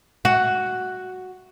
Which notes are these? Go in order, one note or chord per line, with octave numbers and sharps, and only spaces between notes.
F#4